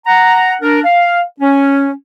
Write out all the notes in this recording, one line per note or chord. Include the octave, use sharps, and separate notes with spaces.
F#5 A#5
D4 A#4
F5
C#4